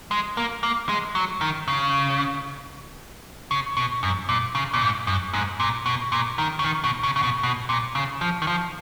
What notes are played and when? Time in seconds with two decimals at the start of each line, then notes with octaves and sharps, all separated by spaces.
0.11 G#3
0.37 A#3
0.63 A#3
0.89 G#3
1.15 F#3
1.41 D#3
1.68 C#3
3.51 C#3
3.77 B2
4.03 F#2
4.29 A#2
4.55 C#3
4.73 A#2
4.81 G#2
5.07 F#2
5.34 G#2
5.60 A#2
5.86 B2
6.12 A#2
6.38 D#3
6.59 C#3
6.64 D#3
6.84 B2
7.03 C#3
7.16 C#3
7.23 B2
7.43 B2
7.69 A#2
7.95 C#3
8.21 F3
8.42 D#3
8.47 F3